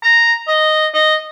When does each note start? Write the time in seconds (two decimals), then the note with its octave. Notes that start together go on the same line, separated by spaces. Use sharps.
0.03 A#5
0.48 D#5
0.94 D#5